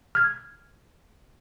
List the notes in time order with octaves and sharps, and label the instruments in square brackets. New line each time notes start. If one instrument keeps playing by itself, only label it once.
[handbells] F6 G#6